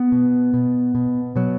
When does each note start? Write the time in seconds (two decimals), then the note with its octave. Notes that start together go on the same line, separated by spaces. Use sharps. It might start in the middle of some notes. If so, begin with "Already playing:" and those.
Already playing: B3
0.12 B2
0.54 B2
0.95 B2
1.36 B2 F#3